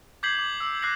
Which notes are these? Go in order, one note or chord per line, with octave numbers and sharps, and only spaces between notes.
D6 G6 G#6 B6 C7 F#7
D6
D6 E6
D6 F#6 A#6 C7